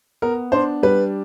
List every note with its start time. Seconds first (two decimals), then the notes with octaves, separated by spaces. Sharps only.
0.22 B3 A#4
0.52 D4 C5
0.83 G3 B4